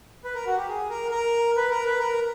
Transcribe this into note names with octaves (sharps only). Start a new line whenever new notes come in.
B4
A#4
F#4
G4
G#4
A#4
A#4
B4
A#4
B4
A#4